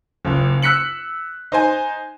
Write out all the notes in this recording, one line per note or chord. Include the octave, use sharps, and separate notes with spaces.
F#1 C#2
E6 F#6 B6 C#7 F#7
D#4 C5 G#5